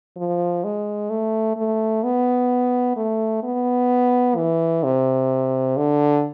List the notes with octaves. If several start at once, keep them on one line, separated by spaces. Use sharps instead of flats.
F3
G#3
A3
A3
B3
A3
B3
E3
C3
D3